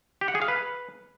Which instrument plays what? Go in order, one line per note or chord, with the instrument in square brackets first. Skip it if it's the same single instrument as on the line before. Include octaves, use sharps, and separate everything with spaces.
[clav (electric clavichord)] G4
F#5
G#4
F5
B4